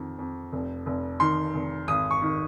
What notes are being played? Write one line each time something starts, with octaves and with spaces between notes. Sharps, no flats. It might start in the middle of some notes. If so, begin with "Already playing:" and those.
Already playing: F2 D#3
F2
F1
F1
D#3 C6
F1
G#1 D#6
C#6
D#3